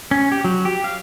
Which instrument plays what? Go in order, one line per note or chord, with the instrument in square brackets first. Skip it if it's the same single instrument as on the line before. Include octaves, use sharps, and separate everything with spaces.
[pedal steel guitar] C#4
G4
F#3
G4
F5